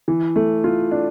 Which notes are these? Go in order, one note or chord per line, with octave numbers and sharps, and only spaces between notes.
E3
A3
F4
D4